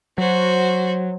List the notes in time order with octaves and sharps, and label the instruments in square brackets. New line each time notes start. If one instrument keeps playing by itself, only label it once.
[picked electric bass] F#3 [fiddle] F#4 C5